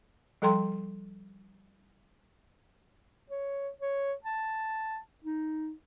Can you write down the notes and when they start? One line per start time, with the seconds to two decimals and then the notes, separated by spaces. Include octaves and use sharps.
0.42 F3 G3 A4 G5 A#5 C6
3.30 C#5
3.81 C#5
4.24 A5
5.24 D#4